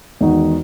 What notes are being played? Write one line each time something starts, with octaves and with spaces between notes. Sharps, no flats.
E2 D#3 G#3 D#4 F#4